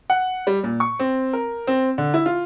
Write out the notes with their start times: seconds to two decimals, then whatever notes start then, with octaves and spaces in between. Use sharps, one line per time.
0.10 F#5
0.47 G3
0.64 A#2
0.80 C#6
0.99 C4
1.33 A#4
1.67 C4
1.98 D3
2.14 E4
2.26 F4